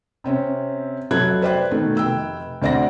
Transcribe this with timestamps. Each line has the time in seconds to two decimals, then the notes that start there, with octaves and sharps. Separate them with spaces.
0.24 C3 C4 C#4
1.11 F1 F#3 A4 F#6 G#6
1.42 B4 C5 D5 G5 F#6
1.71 B2 D#3 A3
1.97 F1 G5 E6
2.62 D2 C4 D5 F#5 A#6